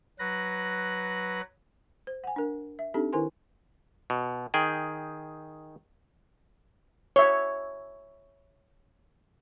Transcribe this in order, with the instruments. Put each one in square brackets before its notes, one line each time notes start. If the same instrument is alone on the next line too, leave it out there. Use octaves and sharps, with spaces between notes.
[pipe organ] F#3 B4 F#6 A#6
[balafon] C5
F#5 G#5
D4 A#4
E5
C4 D4 D#4 G4 A4
D#3 E4 A#4 C5 G#5 C6
[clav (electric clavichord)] B2
D#3 G#4 G5
[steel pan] C#5 E5